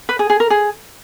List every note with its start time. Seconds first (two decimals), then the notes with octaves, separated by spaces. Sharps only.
0.09 B4
0.19 G#4
0.30 G#4
0.40 A#4
0.50 G#4